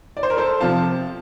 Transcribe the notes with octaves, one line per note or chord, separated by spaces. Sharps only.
D5
C5
A#4
A4 C5
C3 F3 F5 A5